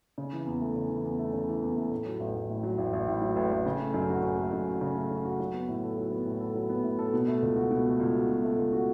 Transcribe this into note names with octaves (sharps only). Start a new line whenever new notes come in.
C#3
E3
E2
A3
C#3
E3
E2
A3
C#3
E3
E2
A3
A2
F#3
A1
A1
A2
F#3
A1
A1
A2
F#3
A1
A1
C#3
A3
F#2
F#4
C#3
A3
F#2
F#4
C#3
A3
F#2
F#4
F#3
B3
A2
A4
F#3
B3
A2
A4
F#3
B3
A2
A4
B2
A3
C#2
F#4
B2
A3
C#2
F#4
B2
A3
C#2
F#4